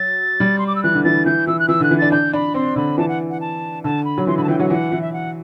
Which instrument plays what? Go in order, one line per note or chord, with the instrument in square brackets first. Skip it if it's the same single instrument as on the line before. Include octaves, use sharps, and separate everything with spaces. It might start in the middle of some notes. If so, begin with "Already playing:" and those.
Already playing: [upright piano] F#3 [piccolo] A6
[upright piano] G3
[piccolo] C6
D6
E6
[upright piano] E3 [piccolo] F#6
[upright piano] D3
[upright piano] E3 [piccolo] A6
[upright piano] E3 [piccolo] G6
[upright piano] E3 [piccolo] E6
[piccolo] F#6
[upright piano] E3 [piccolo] E6
[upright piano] D3
[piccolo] F#6
[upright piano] E3
[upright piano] D4 [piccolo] A6
[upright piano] D4 [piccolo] G6
[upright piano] D4 [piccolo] B5
[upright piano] C4 [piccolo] C6
[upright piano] D3 [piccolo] B5
[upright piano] E3 [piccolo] A5
[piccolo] F#5
F#5
A5
[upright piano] D3 [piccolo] A5
[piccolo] B5
[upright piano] F#3
[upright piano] E3 [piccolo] C6
[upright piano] D3 [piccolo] B5
[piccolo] A5
[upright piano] E3 [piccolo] G5
[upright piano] F#3 [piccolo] F#5
[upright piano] E3 [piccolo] F#5
[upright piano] E3
[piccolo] E5
F#5